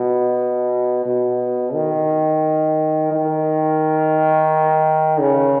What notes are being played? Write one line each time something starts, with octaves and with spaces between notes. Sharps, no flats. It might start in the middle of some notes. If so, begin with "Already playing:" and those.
Already playing: B2
B2
D#3
D#3
C#3